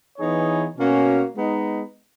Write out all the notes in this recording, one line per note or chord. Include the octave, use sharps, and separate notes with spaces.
E3 B3 D#4 G#4 C#5
B2 A#3 C#4 F#4
G#3 B3 D#4